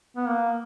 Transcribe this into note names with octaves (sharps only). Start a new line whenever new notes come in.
B3
A#3